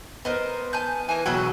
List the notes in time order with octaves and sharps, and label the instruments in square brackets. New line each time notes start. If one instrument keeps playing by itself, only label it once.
[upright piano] B3 [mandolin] A#4 C5 D#5
[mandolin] G#5 A5 G6
[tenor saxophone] E3 [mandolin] A#4 G#5
[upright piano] E1 B1 G5 [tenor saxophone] F#3 [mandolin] F#4 A4 B4